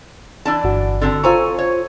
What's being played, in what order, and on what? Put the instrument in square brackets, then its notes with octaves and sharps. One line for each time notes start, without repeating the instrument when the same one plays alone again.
[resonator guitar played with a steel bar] E3 D4 A5
[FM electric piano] G1 F#4
[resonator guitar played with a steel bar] D3 C4 A5
[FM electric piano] F4 C5 C#6 [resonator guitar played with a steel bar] A4 G#5 A#5
[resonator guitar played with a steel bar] C#5